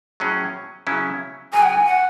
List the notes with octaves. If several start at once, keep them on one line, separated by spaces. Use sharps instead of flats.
A2 F#3 C#4 G#4
C#3 F#3 C#4 E4
C#3 F#3 C#4 F#4 G#5
F#5
G#5
F#5